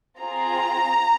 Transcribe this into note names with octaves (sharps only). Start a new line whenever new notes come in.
C4 F4 G#4 A#5